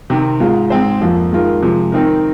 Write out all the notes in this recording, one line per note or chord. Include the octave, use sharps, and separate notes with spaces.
C3 D#3 C4
G#2 G#3 F4
G#2 G#3 C4 G#4 C5
F2 F3 A#3
D#3 G#3 F4 A#4
C3 F3 G#3
D#3 C4 D#4 A#4